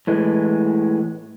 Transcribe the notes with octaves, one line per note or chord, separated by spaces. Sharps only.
A2 E3 G#3